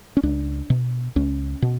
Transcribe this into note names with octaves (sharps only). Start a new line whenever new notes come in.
C#4
C#2 D4
B2
C#2 C#4
B2